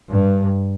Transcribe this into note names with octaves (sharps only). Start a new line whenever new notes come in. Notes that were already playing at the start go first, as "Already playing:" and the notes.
G2